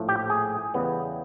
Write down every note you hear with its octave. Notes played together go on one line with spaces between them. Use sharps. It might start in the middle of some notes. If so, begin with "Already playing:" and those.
Already playing: A#1 A2 F3 A3
G4
G#4
E2 C#3 E3 G3 B3